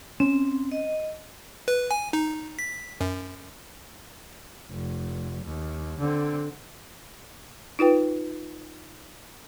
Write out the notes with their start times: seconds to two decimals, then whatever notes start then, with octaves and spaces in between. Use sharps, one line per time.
0.20 C4 C#4
0.72 D#5
1.68 B4
1.91 G#5
2.13 D#4
2.59 B6
3.01 F#2
4.71 F1
5.46 D#2
5.99 D3 C4
7.79 D#4 F4 B4 G5